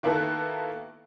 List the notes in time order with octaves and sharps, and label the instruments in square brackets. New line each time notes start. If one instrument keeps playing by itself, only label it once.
[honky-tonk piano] D#3 A#3 B3 E4 F#4 A4